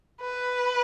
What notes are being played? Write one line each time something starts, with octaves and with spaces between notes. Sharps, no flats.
B4